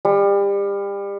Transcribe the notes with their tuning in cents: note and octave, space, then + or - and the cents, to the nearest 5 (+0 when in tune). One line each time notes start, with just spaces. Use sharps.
G3 +30